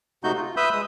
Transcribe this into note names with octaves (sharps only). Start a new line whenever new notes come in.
C3 A3 D#4 F#4 G6
F4
B4 E5 B5 D#6 E6 G6
G#3 D#6